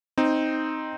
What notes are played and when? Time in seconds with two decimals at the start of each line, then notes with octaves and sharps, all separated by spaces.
0.17 C4 D#4